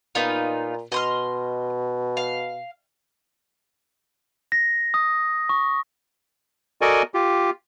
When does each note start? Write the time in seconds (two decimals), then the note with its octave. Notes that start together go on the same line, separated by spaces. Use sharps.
0.15 A#2 B3 D#4 F4
0.92 B2 D#5 C6 F6
2.17 F5
4.52 A#6
4.94 D#6
5.49 C#6
6.81 F#4 A4 A#4 D5 D#5 G#5
7.14 F4 G4